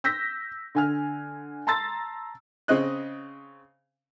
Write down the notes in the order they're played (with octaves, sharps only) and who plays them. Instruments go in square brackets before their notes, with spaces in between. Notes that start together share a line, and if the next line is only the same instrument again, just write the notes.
[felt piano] E6 G6 A#6 B6
D3 G#5 F6
A5 A#5 C6 E6 A6
[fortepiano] C#3 C4 D#5 F#6